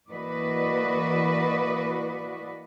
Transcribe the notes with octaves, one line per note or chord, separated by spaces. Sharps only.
E3 A#3 F#4 B4 D5 D#5